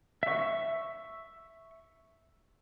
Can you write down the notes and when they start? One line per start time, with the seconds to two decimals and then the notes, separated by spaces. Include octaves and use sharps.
0.23 E5 C#6